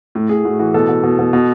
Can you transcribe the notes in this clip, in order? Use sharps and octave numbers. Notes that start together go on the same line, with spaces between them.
A2
A2 G#4
A2 F#4
E3 F#4
B2 A4
B2
B2
B2
B2